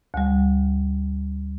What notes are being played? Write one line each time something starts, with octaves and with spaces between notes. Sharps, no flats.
D2 G3